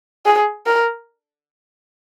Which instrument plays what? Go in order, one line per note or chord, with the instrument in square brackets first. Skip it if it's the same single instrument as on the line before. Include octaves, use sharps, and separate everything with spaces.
[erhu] G#4
A#4